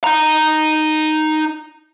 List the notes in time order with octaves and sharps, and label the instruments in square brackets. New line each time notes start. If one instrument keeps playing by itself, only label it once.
[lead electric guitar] D#4 A#5